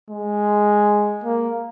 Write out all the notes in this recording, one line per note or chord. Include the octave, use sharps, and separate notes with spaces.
G#3
A#3